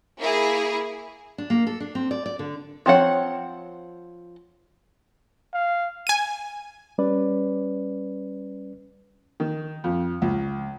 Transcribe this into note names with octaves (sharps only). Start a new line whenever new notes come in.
A#3 E4 G#4
D4
A#3
A4
D4
C4
D5
D5
D3
F3 C4 C#5 F#5
F5
G#5 D#7
G3 C#4 B4 D5
D#3
F2
C#2